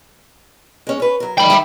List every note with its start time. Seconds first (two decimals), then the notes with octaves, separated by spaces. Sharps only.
0.87 G#3 C#4
1.00 C#4 B4
1.20 F#3 A#4
1.38 D2 D#3 G5 B5
1.50 D#3 E5